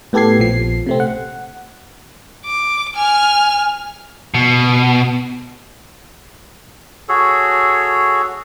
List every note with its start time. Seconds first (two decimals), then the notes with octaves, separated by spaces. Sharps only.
0.13 A2 B3 G4 A4 G#6 C7
0.39 A#1 F3 C7
0.86 C3 A3 C4
1.00 F#5
2.45 D6
2.96 G#5 F6
4.34 B2
7.09 F#4 G#4 A4 C#5